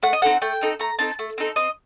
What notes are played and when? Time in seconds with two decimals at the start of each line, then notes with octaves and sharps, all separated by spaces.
0.03 A3 F#5
0.13 D#5
0.22 C4 D#4 A4 F#5
0.42 A3 G5
0.61 C4 D#4 A4
0.79 A3 A#5
0.99 C4 D#4 A4 A5
1.19 A3
1.38 C4 D#4 A4
1.56 C4 D#5